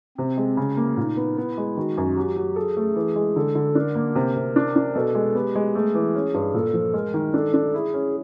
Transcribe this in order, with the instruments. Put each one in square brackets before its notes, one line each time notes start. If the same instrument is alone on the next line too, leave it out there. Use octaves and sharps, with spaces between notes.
[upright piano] C3 [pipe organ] C4
[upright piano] G#3
C#3
A#3
[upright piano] A#2 [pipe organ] D#4
[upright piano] B3
[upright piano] B3 [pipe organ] E4
[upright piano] G#3
[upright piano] D#3 [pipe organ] F#4
[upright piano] F#2
[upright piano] F#3 [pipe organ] G4
[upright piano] F#3
[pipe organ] G#4 [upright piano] A4
[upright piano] A3
E3
G#3
[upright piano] D3 [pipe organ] A4
[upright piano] D3
[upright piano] D4 [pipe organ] A#4
[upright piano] A#3
C3
C3
D4
D4
[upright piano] B2 [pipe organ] A4
[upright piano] G#3
[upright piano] B3 [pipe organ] G4
[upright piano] G#3
[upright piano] A3 [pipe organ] G#4
[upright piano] E3
C#4
G2
[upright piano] A#2 [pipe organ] A4
[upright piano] F3
[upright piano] G#3 [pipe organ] A#4
[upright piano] D#3
[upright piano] D4 [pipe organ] A4
[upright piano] D4
[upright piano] E4 [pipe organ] G#4
[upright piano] C#4